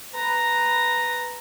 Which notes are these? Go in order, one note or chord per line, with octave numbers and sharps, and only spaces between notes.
B4 A#5